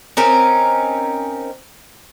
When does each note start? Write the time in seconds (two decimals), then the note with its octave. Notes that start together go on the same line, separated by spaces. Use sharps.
0.17 C4 C#4 D#4 A#4